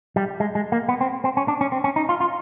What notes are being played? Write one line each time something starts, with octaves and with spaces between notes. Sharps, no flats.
G3
G#3
G#3
A#3
B3
C4
C4
C#4
D4
C#4
C4
C#4
D#4
F4
F4